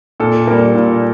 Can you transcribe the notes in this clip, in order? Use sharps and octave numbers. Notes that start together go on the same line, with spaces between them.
A#2 A4
G3 A#3
A#2